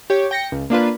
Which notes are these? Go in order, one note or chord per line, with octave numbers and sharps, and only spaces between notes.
G4 C#5
G5 A#6 C#7
C#2
A#3 D4 F4 B4